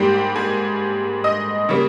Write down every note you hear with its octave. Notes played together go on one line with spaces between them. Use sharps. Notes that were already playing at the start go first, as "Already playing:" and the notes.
Already playing: G#2 G3 A#3 G4 G5
G#4 G#5
D#5 D#6
C#3 G3 A#3